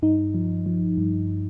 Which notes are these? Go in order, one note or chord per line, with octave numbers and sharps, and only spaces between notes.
G2 D#4
F3
F3
G2